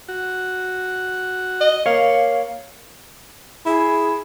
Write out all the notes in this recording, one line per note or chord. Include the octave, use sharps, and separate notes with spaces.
F#4
D#5
A#3 C#5 F5
E4 G#4